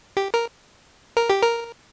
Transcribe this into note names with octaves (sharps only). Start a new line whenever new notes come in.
G4
A#4
A#4
G4
A#4